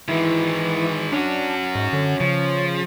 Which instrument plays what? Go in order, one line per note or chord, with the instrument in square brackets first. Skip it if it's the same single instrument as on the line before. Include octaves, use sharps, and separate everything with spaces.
[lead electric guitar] D#3 G#3 [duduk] E3 [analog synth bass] E4
[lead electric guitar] C#4 F#4 [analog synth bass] D4
[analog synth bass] G#2
[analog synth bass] D3 [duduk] C#5
[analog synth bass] C#3 [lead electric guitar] F3